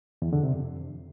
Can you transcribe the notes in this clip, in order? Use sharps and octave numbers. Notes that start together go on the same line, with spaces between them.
E2
D3
C3
F2